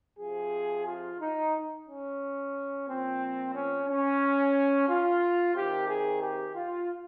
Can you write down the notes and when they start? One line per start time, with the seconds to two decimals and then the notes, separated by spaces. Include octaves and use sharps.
0.18 C3 F3 G#4
0.85 F4
1.20 D#4
1.86 C#4
2.86 A#2 F3 C4
3.54 C#4
3.87 C#4
4.88 F4
5.54 C3 D#3 G4
5.88 G#4
6.21 G4
6.55 F4